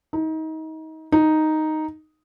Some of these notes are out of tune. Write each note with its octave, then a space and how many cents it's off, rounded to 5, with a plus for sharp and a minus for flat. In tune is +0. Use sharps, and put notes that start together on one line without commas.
D#4 +30
D#4 +0